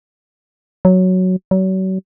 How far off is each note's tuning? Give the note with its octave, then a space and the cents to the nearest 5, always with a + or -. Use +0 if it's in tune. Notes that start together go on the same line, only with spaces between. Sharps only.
F#3 +0
F#3 +35